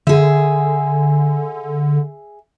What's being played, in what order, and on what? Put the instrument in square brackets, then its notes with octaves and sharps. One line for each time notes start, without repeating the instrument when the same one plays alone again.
[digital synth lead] D3 [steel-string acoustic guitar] G#4 E5